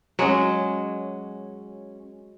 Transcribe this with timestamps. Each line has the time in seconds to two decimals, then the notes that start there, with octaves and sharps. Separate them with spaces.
0.19 F#3 G#3 C#4 C#5 D#5